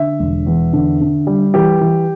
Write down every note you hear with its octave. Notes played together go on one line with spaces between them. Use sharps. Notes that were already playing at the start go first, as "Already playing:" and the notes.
Already playing: D3 E5
E1
E2
D3
D3
G3
E3 G4
E3